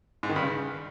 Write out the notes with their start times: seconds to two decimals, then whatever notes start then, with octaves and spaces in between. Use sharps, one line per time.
0.23 G#2
0.29 D#3
0.36 G2
0.42 C#3